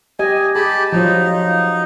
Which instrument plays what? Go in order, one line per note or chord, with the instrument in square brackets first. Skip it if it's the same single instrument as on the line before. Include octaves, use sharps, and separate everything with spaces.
[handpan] G4 D#5 [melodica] G#5
[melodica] G4 A5 B5 [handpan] G#4
[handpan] F3 F#3 F4 [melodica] D#4